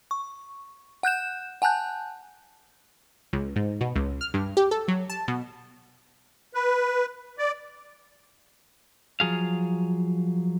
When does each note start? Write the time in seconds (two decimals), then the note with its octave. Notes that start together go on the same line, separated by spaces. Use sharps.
0.11 C#6
1.03 F#5 F#6 G6 E7
1.62 F#5 G#5 A5 F#6 G6
3.33 C#2
3.56 G#2
3.81 B2
3.95 C#2
4.21 F6
4.34 G2
4.57 G4
4.71 A4
4.88 F#3
5.10 A5
5.28 B2
6.54 B4
7.38 D5
9.20 F3 F#3 G#4 F5